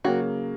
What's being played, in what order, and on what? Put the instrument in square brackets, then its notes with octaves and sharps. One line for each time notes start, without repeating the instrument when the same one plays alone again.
[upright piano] C#3 F#3 A#3 [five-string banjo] F#4